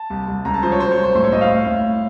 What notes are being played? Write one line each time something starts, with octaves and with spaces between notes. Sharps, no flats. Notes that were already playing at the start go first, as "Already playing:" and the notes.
Already playing: A5
C2
C2
C#2 A#5
A5
F3 C5
C#5
F#3 C5
C#5
C2
C5
A2 C5
C#5
A2 D#5
F5
A2
A2